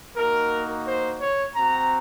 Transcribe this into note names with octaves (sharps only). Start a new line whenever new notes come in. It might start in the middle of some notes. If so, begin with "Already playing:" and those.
A#3 D#4 F#4 A#4
C5
C#5
C4 F#4 A#5